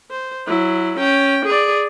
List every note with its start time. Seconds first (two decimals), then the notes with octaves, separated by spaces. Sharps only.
0.11 C5
0.47 F#3 E4
0.99 C#4 G5
1.45 G#4 D5